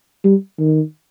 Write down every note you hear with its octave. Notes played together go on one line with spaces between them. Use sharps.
G3
D#3